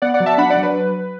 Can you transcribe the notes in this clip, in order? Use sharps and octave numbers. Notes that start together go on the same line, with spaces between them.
B3 D5 F#5
D5 F#5
F#3
E5 A5
D4 F#5 B5
D5 F#5
F#3
B4